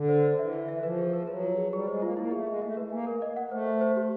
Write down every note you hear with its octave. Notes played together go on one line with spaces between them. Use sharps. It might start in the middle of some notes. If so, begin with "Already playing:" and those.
Already playing: D3
C5
C5
E3 E5
E5
E5
F3 B4
G#4
B4
F#3 B4
F4
G#4
G3 G#4
G#3 C5
A#3 F4
A#3 E4
A3 G#4
G#3 G#4
A3 E5
B4
A#3 G#5
A#4
D#5
F#5
A3 C5
C5
C5
G4